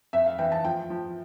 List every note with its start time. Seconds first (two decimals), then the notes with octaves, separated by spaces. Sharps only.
0.13 F2 E5
0.25 F5
0.39 E3 G5
0.52 A5
0.65 F3 G5
0.90 F3